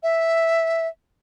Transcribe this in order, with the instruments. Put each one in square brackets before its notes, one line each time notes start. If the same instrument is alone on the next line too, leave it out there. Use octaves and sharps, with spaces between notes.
[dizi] E5